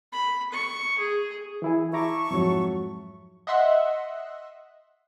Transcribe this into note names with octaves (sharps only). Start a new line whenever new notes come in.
B5
C#6
G#4
E3 E4 G#4
E4 E5 A5 A#5 C#6 D6
F2 G#2 F#3
D#5 E5 F#5 C6 E6 F#6